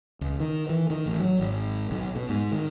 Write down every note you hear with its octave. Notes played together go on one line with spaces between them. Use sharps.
C#2
D#3
E3
D#3
A1
F#3
G#1
B1
B2
G#2
D#3